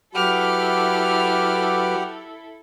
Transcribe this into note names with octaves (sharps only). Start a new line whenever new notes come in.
F#3 E4 G4 A4 B4 F#5 D6 F6